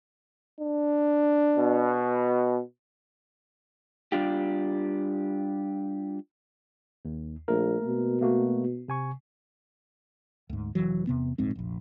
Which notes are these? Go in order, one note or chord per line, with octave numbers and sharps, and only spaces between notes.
D4
B2
G3 D4 F4 G4
D#2
A#1 A3 A#3 A#4
B2
A3 A#3 F#4
C3 G#5 C#6
D2 G#2
F1 B1 E3 F#3
E2 C3 B3
D1 A#1 G#2 C4
F1 A#1